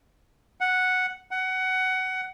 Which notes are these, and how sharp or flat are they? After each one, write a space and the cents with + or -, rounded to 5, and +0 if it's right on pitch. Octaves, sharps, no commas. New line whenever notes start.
F#5 -5
F#5 +15